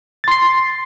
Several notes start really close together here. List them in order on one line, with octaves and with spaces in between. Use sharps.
A6 C6 C7